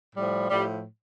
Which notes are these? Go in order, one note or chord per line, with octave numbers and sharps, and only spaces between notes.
A2 F3 G3
A2 F3 G3